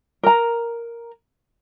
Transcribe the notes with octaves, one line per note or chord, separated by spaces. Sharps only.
A#4 A#5